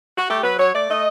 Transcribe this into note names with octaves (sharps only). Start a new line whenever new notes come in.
F#4
A3 G4
F#3 B4
F#3 C#5
A3 D5
A3 D#5